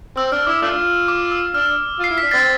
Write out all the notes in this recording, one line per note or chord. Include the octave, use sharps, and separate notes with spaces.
C4 E6
D4 F6
E4 D6
A3 D4 F4 E6
D6
E6
D4 F6
F4 C7
E4
D4 B6
C4 A6